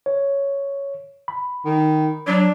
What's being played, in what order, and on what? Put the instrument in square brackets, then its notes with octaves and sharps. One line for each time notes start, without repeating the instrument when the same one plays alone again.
[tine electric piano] C#5
B5
[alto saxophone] D#3
[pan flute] F#3 [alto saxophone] D4